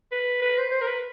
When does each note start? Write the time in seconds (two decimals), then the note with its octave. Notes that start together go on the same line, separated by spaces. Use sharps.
0.12 B4
0.42 B4
0.58 C5
0.71 C5
0.81 A#4
0.87 B4